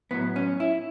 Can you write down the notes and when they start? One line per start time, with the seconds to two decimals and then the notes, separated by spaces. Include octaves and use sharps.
0.11 A2 F#3 B3
0.36 C#4
0.60 E4